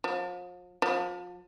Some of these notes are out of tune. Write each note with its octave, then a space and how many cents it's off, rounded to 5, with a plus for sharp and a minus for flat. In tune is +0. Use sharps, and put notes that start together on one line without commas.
F3 +40
F3 +35